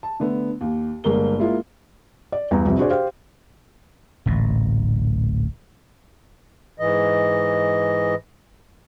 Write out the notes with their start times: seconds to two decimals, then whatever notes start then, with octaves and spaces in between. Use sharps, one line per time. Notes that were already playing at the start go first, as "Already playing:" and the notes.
0.03 A5
0.20 D3 A3 B3
0.61 D#2
1.04 G1 G#3 A#3 A#4 G7
1.39 G#3 A#3 E4 F4
2.32 D5
2.51 E2 G2 A#5
2.65 C2 F2 C3
2.78 D4 F#4 G#4 C5 D5
2.90 G4 C5 F5
4.26 D1 A1 A#2
6.79 G#2 E3 D#5